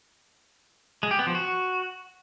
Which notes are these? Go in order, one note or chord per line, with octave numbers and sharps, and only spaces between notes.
G#3
G4
B3
F3
F#4